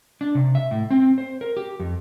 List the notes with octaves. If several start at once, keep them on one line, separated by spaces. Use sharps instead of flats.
D4
C3
E5
A2
C4
C5
A#4
G4
F2